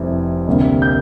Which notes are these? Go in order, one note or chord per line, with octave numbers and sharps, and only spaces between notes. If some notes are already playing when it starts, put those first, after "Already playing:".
Already playing: F1 F2 C3 E3 G3
D2 C3 G3 A#3
G6